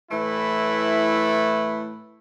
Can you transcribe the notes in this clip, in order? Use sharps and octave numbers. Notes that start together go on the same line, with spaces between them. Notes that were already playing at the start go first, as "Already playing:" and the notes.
A2 E3 A3 E4 B4